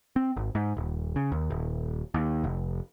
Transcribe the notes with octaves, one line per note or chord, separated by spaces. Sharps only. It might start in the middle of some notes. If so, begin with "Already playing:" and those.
C4
G#1
G#2
D#1
C#3
D#2
D#1
D#2
F1